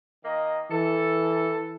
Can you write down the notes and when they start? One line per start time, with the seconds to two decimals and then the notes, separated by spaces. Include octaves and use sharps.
0.24 D#3 A#3 D#5
0.71 E3 A4